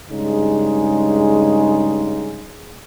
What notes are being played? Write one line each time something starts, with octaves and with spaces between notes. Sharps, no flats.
G2 C#3 G#3 D#4 G#4